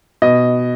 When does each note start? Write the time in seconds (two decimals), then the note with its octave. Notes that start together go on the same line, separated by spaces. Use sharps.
0.22 B2 D#5